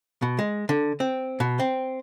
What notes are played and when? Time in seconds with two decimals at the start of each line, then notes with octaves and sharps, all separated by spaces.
0.22 B2
0.39 G#3
0.69 D3
1.00 C4
1.40 B2
1.60 C4